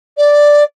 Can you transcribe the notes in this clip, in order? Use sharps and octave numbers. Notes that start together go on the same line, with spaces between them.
D5